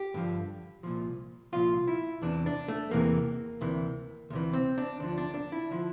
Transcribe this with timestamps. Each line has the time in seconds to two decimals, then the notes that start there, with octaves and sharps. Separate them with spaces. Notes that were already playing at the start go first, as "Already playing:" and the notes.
Already playing: G4
0.14 G2 D3 F3
0.83 C2 A#2 F3
1.52 C2 A#2 F3 F4
1.87 E4
2.22 E2 C3 E3 D4
2.46 D4
2.68 A3
2.91 E2 C3 E3 A#3
3.61 D2 C3 E3
4.30 D2 C3 E3
4.53 C4
4.78 D4
5.00 D2 D3 F3 D4
5.18 D4
5.35 D4
5.52 E4
5.71 D3 F3